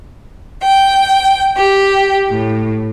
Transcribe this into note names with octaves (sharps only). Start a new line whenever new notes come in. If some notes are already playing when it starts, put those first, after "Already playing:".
G5
G4
A2